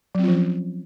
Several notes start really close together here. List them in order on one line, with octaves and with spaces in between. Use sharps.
F#3 C4 F4 F3 C#4